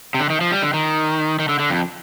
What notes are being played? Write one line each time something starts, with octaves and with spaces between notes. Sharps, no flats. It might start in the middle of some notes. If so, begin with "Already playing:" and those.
C3
D3
D#3
F3
G3
D3
D#3
D#3
D3
D3
F2